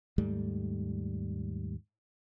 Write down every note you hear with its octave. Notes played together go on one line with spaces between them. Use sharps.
D#2 G#2 G3 A3